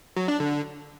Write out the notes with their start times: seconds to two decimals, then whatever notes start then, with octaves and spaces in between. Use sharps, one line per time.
0.17 F#3
0.28 D4
0.40 D3